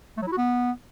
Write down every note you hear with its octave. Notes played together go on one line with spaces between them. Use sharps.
A3
F#3
E4
F#4
B3